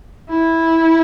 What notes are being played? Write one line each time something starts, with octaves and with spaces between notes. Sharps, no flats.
E4